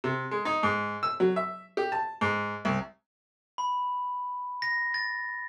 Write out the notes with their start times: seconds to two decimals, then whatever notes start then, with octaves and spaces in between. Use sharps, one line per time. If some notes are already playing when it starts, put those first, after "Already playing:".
0.04 C3
0.31 G#3
0.45 D#4
0.63 G#2
1.03 E6
1.20 F#3
1.36 E5
1.77 G4
1.92 A5
2.21 G#2
2.65 C2
3.58 B5
4.62 A#6
4.94 A6